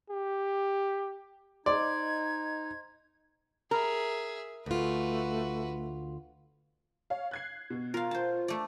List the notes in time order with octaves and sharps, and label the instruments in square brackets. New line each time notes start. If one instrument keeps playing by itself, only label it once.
[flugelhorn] G4
[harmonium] D#4 [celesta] C5 D#5 C6 [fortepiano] D5 [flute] G#6
[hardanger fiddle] G#4 E5 [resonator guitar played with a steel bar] A#4
[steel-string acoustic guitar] D2 F4 [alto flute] A3 [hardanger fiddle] F#4 B4
[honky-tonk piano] C#5 F5
F#6 G#6 C7
B2
[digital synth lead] F4 [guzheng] A#4 F5
[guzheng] C5 A5
A3 D5